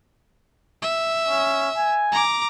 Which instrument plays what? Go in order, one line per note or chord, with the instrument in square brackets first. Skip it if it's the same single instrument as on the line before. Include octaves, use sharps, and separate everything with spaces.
[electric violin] E5
[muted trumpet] C#4
G#5
[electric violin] A#5 D6